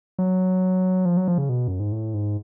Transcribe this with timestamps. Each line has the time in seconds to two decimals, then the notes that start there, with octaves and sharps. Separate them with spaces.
0.19 F#3
1.05 F3
1.17 F#3
1.28 F3
1.38 C#3
1.49 B2
1.68 F#2
1.80 G#2
1.92 A2
2.14 G#2